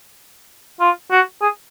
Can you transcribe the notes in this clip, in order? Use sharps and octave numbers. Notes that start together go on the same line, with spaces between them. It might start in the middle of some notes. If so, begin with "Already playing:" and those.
F4
F#4
G#4